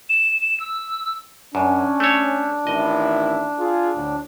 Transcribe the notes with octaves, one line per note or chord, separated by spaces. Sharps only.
E7
E7
E6
F#2 C#4 D4
A3 C#5
A1 D#3 E4 D#5
F4 G#4
D2 A2